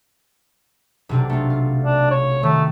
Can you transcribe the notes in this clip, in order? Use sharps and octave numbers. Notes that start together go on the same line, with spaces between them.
B1 C3 D4
A3 F4
F4
D4
C#5
D#3 A3